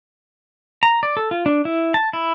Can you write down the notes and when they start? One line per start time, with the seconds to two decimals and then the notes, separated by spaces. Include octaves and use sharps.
0.83 A#5
1.03 D5
1.17 A4
1.31 F4
1.46 D4
1.65 E4
1.94 A5
2.13 E4